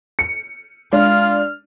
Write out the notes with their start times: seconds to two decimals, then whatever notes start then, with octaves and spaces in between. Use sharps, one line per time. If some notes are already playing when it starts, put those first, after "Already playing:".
0.19 C#7
0.93 G#3 D4 F4 F6